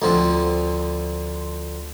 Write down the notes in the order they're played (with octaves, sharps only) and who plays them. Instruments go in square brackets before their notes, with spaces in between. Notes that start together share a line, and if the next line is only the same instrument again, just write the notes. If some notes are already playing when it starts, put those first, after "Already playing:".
[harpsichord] D2 D3 F3 C4